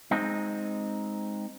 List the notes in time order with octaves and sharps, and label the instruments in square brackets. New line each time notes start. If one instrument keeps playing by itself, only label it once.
[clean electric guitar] G#3 C4 D#4